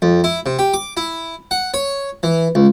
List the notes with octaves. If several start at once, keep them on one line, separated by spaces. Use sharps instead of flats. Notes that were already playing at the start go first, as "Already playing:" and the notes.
F2
E4
C3
G4
D6
E4
F#5
C#5
E3
C#2